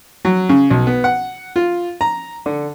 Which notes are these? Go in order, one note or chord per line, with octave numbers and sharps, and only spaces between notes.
F#3
C#3
B1
B3
F#5
F4
A#5
D3